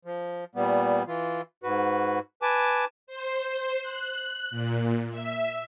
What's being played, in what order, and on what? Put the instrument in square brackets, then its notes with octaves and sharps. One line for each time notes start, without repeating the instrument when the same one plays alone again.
[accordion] F3
A#2 G3 B3
E3 F4
G#2 F#4 B4
B4 G#5 A5 D6
[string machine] C5
F#6
A#2
E5